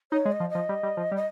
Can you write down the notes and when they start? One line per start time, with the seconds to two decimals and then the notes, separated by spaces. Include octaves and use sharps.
0.12 D#4 C#5
0.25 G#3
0.31 D#5
0.40 F3
0.49 D#5
0.55 F3
0.69 G3
0.83 G3
0.97 F3
1.11 G3
1.16 D#5